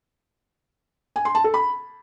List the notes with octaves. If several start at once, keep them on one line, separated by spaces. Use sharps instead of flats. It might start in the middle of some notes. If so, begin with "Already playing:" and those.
G#5
C6
A5
A4
B5